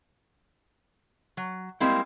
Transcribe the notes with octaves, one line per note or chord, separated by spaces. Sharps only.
F#3
G3 G#3 A#3 C4 E4